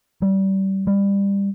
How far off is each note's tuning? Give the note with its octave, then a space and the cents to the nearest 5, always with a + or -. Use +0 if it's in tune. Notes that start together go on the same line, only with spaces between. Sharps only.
G3 -25
G3 +20